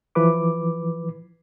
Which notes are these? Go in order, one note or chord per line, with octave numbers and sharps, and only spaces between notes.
E3 F3 B4 D6